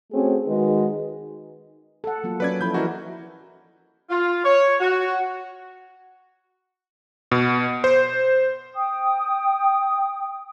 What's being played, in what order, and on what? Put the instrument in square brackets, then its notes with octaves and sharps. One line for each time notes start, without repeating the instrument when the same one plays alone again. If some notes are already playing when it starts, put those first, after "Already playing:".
[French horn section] A3 C4 C#4 F#4 G#4
D#3 G#3 D#4 F#4 B4
[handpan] A4 F#5
F#3 A#3 F4
[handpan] F#3 C#4 [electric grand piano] B4 D5 G#6
[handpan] F3 E4 A4 [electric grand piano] B5 G6
[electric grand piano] E3 F#4 [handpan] C#4 A#4 D#5
[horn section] F4
C#5
F#4
[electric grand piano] B2
C5
[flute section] G5 D#6